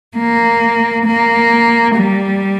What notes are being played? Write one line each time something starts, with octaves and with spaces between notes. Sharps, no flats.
A#3
A#3
G3